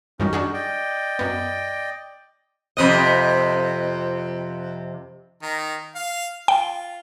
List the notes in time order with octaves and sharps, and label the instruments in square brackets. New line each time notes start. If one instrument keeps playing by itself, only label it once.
[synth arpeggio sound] F#2 D#3 G3 [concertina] C#4 D#4
[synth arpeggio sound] D4 F#4 G#4
[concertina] D5 D#5 G5
[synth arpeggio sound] F#2 B3
[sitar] F2 C3 D#5
[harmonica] D#3 A#5
F5
[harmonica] F4 [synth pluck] G5